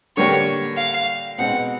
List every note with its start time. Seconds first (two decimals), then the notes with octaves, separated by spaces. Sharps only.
0.17 D3 G3 A#3 D4 G4 C#5
0.77 F5
1.38 B2 G#3 C4 D#4 F#5